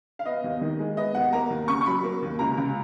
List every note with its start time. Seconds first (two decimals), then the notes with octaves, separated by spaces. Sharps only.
0.19 F5
0.26 B3 D#5
0.44 D#2
0.61 D#3
0.79 G#3
0.97 B3 D#5
1.15 D#2 F#5
1.33 A#3 A#5
1.50 D#2
1.68 C#3 C#6
1.81 C#6
1.86 F#3 B5
2.04 A#3
2.22 D#2
2.39 C#2 A#5
2.57 C#2